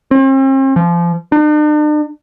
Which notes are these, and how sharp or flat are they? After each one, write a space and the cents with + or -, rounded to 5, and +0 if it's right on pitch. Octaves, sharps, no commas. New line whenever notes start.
C4 +45
F3 -25
D4 +45